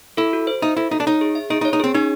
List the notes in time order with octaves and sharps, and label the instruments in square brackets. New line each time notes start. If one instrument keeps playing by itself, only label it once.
[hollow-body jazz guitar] E4 [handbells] A4
[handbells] F#4
C5
[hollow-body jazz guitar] D#4 [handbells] E5
[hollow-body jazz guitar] E4 [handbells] A4
[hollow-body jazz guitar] D#4 [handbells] F#4
[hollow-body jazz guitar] D4
[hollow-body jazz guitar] D#4 [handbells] C#5
[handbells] G#4
E5
[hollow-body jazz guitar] D#4 [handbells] G#4
[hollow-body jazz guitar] D#4
[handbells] C#5
[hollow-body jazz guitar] D#4
[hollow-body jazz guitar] C4 [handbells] G#4
[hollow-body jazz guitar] C#4 [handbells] D#4